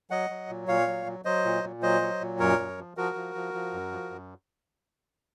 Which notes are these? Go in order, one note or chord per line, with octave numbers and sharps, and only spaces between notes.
F#3 D#5 F#5
F#3
A#2
A#2 C#5 F5
F#3
F#3
F#3 C5 D#5
A#2
A#2
F#3 C5 D#5
F#3
A#2
F#2 A#4 C#5
F#2
F3
F3 F#4 A#4
F3
F3
F3
F#2
F3
F#2